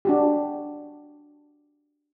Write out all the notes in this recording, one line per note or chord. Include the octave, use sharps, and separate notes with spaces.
D4 F#4 G4